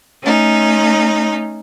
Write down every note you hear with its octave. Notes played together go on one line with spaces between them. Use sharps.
A3 C#4 D#4